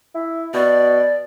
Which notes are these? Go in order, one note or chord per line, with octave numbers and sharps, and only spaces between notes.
E4
B2 D5